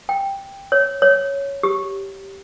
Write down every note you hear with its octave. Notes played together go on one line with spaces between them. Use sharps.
G5
C#5
C#5
G4